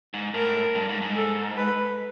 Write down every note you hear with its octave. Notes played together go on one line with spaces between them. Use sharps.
G#2
A2 A#4
G2
G#2
G#2
A4
B4